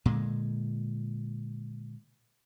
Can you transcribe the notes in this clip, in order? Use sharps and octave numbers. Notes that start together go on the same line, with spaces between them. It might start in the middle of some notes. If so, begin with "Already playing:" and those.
A#2 D3 G#3